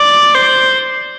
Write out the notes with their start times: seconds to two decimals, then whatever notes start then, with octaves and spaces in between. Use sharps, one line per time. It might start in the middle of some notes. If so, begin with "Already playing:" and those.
Already playing: D5
0.35 C5